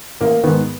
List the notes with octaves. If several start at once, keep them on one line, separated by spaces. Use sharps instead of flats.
A1 A#3
G#2 D#3 B3